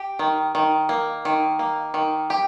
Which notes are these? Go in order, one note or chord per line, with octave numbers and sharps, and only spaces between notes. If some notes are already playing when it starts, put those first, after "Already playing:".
Already playing: G4
D#3
D#3
A#3
D#3
A#3
D#3
G4